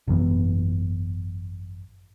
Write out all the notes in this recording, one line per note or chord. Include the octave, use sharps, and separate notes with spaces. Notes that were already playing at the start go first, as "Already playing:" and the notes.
G#1 F#2 E3 B3